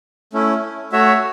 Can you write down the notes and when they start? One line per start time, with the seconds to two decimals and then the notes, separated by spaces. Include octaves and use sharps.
0.33 A3 C#4 E4
0.92 A3 F#4 C#5 E5